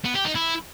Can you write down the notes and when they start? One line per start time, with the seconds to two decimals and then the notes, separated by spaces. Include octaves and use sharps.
0.05 B3
0.15 G4
0.25 D#4
0.35 E4